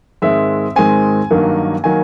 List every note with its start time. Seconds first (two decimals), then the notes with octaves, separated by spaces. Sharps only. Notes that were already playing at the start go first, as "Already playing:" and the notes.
0.22 G#2 D#3 G#3 C4 E5
0.76 G#2 D#3 G#3 C4 G#5
1.30 G2 D#3 F#3 A#3
1.84 D#3 F#3 A#3 G#5